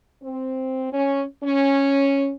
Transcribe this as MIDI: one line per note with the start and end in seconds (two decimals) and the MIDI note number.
0.23 0.92 60
0.92 1.23 61
1.43 2.33 61